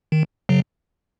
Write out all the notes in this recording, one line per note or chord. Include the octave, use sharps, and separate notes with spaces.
D#3
C#3 F#3